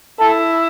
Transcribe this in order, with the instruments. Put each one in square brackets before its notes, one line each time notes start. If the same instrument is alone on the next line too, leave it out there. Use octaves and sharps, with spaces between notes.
[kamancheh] E4 [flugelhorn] A4